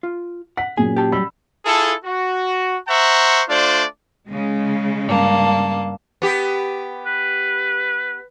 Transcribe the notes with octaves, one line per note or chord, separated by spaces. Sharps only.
F4
F#5 B6
A#2 F#3 C#4 G#4 G#5
G4 A5
F#3 G3 B5 E6
E4 F4 G#4 A4
F#4
C5 E5 F#5 A#5 C#6
A3 D4 F4 C5 D5
C#3 G#3
G2 A#3 A5
B3 G4
B4